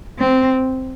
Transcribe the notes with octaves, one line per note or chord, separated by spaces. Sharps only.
C4